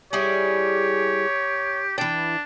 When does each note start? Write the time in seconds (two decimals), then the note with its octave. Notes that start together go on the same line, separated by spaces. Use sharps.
0.13 G3 E4 G4 G#4 C#5
1.98 E3 D4 G5